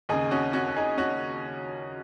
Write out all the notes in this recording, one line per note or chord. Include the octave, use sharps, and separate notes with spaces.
D#2 C#3 D#4 G#4
C#4 F#4
C#4 F#4
F#4
D#4 G#4
C#4 F#4